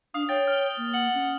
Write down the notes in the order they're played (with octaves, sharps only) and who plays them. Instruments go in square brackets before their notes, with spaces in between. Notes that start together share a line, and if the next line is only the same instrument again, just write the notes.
[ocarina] D4 [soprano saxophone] F5 [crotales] D#6
[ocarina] C#5 [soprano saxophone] G5 [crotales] A6
[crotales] F6
[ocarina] A#3
[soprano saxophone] F#5 [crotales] F#7
[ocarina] C#4